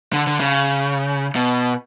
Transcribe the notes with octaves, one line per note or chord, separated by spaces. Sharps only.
D3
D3
C#3
B2